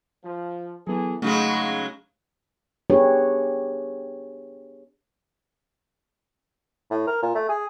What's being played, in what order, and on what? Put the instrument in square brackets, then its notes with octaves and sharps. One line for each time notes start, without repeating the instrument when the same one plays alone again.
[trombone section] F3
[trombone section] E3 G#4 A4 [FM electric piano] F#3 B3
[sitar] C#3 F#3 G#3 [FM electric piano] A3 [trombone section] D#4 F#4
[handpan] B3 D4 G4 G#4 B4 C#5
[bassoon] A2
A#4
A#2
A3
G#4